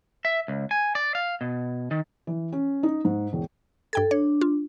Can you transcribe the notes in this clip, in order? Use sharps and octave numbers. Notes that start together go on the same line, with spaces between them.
E5
C#2
G#5
D5
F5
B2
D#3
E3
C#4
D#4
G#2
E1
G2 A4 G5 G#6
D4 C#5
F4